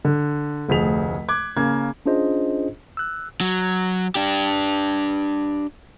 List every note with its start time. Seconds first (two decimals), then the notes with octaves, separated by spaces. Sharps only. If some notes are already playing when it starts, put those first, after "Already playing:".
0.05 D3
0.69 F1 D2 F3 G#4 B6 F7
1.29 D6 F#6 G#6
1.57 C#3 A#3 G#6
2.06 C#4 D4 F4 G#4 C5 D#5
2.97 E6 F#6
3.41 F#3
4.15 D4 G4